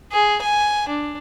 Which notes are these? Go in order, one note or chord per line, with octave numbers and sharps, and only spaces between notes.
G#4
G#5
D4